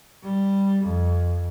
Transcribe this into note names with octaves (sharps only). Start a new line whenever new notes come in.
G3
F2